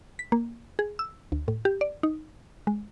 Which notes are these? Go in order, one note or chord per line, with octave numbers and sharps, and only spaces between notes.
B6
A#3
G#4
E6
D2
A2
G4
D5
D#4
G#3